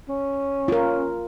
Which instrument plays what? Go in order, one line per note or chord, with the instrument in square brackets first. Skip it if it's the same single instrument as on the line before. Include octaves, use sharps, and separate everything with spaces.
[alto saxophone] C#4
[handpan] F4 A#4